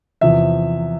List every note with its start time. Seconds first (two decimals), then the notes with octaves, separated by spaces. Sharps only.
0.21 E2 C3 F3 E5